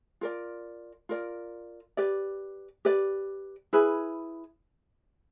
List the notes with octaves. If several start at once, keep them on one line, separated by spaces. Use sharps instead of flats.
F4 A#4 D5
F4 A#4 D5
G4 B4 D5
G4 B4 D5
E4 G#4 B4